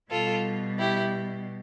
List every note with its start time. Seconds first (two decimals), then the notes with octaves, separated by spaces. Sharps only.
0.10 B2 G3 F4 A4
0.78 E4 G4